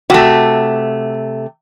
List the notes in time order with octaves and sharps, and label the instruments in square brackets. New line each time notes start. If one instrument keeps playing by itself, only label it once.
[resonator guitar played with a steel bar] C3 A3 [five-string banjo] F#4